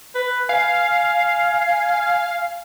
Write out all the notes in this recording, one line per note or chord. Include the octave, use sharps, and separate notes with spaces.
B4
F5 G#5